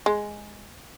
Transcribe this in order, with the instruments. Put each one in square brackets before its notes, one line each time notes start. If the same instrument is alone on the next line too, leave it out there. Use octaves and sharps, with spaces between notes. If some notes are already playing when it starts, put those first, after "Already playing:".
[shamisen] G#3